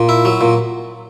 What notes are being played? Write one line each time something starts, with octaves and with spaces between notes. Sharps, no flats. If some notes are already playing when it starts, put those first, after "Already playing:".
Already playing: A#2
E4
F#3
A#2